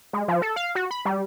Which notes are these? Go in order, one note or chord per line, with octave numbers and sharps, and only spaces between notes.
G#3
F3
A4
F5
F#4
B5
G3